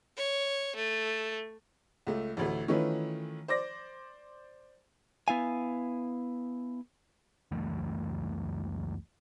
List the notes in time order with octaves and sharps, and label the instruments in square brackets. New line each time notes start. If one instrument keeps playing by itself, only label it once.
[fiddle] C#5
A3
[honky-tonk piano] C#2 A3
A1 D2 A3
D#3 E3 A3 C#4 F4 B4
C5 D5 D6 A#6
[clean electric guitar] B3 E4 F5 G#5
[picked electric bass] C#2 F#2 E3 A3